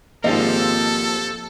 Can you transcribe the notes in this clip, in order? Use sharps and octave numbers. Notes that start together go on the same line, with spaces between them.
G#1 F3 A#3 C4 F4 G4 A4 D#5